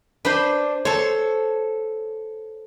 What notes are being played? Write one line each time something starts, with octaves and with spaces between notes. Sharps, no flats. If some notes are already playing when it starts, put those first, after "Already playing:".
D4 B4 C5 B5
A4 C5 C#5